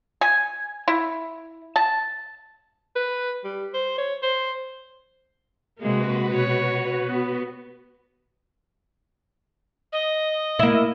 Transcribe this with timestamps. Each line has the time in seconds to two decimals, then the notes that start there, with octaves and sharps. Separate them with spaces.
0.21 G#5
0.88 E4
1.76 A5
2.96 B4
3.44 G3
3.74 C5
3.98 C#5
4.22 C5
5.79 C3 G#3 A#3 F#4 B4
6.29 B2 C#5
7.07 B3
9.93 D#5
10.59 A#3 E4